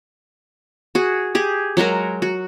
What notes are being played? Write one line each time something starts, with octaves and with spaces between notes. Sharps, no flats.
F#4 G#4
G4 G#4
F#3 G#3 F#4 A#4
F#4